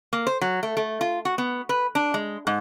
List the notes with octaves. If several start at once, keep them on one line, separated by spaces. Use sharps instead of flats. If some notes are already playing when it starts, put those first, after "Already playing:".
A#3
C5
F#3
A3
A3
F4
F#4
B3
B4
D4
G#3
G#2